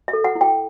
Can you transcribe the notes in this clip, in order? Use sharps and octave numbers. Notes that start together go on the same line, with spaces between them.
E5
A4
F#5
E4
G5